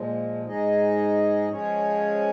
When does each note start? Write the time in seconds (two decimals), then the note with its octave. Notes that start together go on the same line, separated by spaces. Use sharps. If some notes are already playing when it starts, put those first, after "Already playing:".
Already playing: A#2 F3 G#3
0.45 G#2 G#3 D#4 G#4 D#5
1.48 F3 G#3 C#4 G#4 C#5